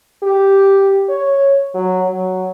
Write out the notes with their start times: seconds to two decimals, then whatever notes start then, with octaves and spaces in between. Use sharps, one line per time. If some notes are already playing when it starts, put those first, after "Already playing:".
0.23 G4
1.09 C#5
1.74 F#3
2.09 F#3